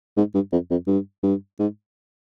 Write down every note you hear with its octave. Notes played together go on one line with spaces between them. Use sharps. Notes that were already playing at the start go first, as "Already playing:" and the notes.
G#2
G2
F2
F2
G2
G2
G#2